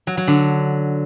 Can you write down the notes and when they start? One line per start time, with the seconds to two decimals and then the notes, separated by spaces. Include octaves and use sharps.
0.07 F#3
0.17 F#3
0.27 D3